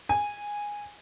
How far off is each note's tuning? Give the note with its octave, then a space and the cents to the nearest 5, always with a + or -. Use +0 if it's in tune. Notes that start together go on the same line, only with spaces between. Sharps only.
G#5 -10